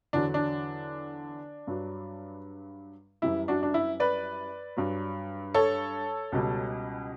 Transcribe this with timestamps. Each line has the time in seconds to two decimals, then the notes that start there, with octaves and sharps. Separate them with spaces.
0.13 E2 D3 F#3 D4
0.34 D4
1.67 G2 F#3
3.22 F#2 E3 G3 E4
3.48 D4 F#4
3.63 D4
3.74 E4
4.00 B4 D5
4.77 G2 F#3
5.54 A4 C#5
6.32 C#2 B2 G3